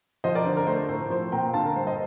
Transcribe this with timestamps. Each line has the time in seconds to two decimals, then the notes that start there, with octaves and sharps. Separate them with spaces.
0.24 F3 C5 D#5
0.35 A#4 D5
0.45 D3 C5
0.56 A#4
0.67 A3 C5
0.89 A2 C5
1.10 F3 C5
1.32 A#2 G5 A#5
1.54 D3 F5 A5
1.65 A#4
1.76 G2 C5
1.87 C5 D#5